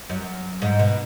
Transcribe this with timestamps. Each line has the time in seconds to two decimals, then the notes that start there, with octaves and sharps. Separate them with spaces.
0.09 F#2
0.62 G#2
0.79 B2